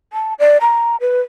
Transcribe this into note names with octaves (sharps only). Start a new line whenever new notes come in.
A5
D5
A#5
B4